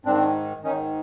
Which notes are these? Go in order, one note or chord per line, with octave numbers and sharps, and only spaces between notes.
G#2 D#3 C4 D4
G#2 D#3 C#4 D#4